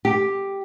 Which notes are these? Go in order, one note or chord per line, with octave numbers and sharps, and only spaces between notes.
G4